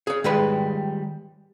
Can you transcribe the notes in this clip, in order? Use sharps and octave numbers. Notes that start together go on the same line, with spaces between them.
G#4 C#5
D#3 G3 G#3 B4 B5